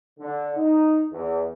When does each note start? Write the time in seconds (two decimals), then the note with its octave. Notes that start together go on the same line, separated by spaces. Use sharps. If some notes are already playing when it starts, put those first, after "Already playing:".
0.20 D3
0.57 D#4
1.12 E2